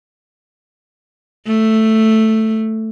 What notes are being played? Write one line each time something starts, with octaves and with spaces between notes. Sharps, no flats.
A3